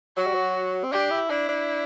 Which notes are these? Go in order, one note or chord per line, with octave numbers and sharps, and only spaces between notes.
F#3 F#4
G3
F#3
C4
D4 G4
E4
D4 E4
D4